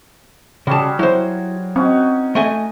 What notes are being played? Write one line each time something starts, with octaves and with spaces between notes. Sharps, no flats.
C#3 G3 F#4 G#4 A5
F#3 E4 C5
C4 C#4 D#4 F#4
A3 D#5 G#5